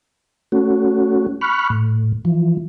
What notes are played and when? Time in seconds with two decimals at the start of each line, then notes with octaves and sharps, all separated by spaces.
0.52 A3 C#4 F#4
1.41 B5 C#6 F6 F#6
1.70 A2
2.25 E3 F3